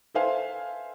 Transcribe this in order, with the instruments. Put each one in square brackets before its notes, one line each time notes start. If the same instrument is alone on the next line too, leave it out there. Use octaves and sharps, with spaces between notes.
[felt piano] A4 B4 C5 E5 F5 G#5